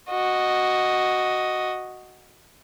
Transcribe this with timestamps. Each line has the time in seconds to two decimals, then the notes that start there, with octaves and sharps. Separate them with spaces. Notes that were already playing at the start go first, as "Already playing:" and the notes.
0.10 F#4 D#5